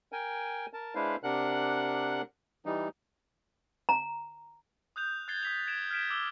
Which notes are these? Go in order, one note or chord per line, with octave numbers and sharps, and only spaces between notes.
A#4 G5 G#5
A#4 A5
G#3 D4 E4 B4 C5 F5
C3 D4 A#4 F#5 F#6
E3 G3 D#4
A#5
D#6 F#6 G6 F7
F#6 G#6 A6 C7 G7
D#6 B6 F7
G#6 D7 E7
F6 G#6 B6 D7 E7
D6 E6 E7 G7